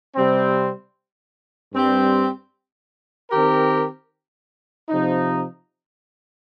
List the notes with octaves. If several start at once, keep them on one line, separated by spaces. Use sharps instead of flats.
C3 G3 C4
G2 G3 C4 G4
D#3 C4 G4 A#4
C3 F3 D#4